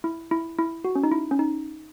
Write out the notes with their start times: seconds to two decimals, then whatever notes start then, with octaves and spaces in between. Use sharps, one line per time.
0.04 E4
0.31 E4
0.58 E4
0.84 F#4
0.95 C#4
1.03 D#4
1.12 E4
1.31 C#4
1.39 D#4